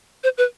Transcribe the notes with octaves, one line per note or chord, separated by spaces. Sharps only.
C5
B4